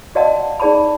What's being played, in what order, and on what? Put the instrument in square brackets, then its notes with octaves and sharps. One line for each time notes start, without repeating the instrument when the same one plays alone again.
[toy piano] F#4 D5 D#5 F5 F#5 A5
D#4 G#4 D5 A5 B5